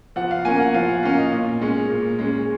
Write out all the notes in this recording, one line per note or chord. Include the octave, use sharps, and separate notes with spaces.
F3 F#5
F5
A#3 C#4 G#5
F#5
F3 F5
F#5
A#3 C#4 F5
D#5
A#2
G#3 C#4
A#2
G#3 C#4